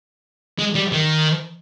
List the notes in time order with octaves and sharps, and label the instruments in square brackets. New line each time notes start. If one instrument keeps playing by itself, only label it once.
[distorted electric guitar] G#3
G3
D#3